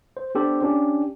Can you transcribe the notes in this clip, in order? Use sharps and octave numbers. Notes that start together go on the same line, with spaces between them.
C5
B3 D4 G4 A4 C5
C#4 D4 G4